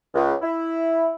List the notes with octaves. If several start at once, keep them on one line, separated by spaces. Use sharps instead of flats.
C#2
E4